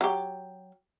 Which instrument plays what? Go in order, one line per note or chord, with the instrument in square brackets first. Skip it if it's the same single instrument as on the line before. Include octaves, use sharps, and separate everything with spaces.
[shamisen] F#3 G4